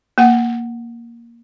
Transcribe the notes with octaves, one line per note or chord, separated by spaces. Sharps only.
A#3 F#5